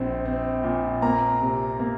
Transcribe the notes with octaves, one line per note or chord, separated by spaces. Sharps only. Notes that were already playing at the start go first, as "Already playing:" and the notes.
Already playing: A#1 C4
C4
A#2
A#3 A#5
C3
A#3